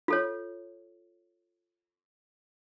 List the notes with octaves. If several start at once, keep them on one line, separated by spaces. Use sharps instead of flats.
F4 A4 C#5